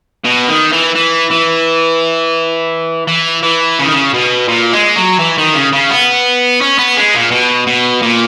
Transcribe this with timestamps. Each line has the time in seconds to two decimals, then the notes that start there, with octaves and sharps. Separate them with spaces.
0.25 B2
0.48 D#3
0.73 E3
0.96 E3
1.31 E3
3.08 E3
3.43 E3
3.79 C#3
3.85 D#3
3.92 C#3
4.14 B2
4.48 A#2
4.73 G#3
4.96 F#3
5.19 E3
5.38 D#3
5.55 C#3
5.73 C#3
5.90 B3
6.61 C#4
6.78 B3
6.96 G#3
7.14 A#2
7.31 B2
7.67 B2
8.02 A#2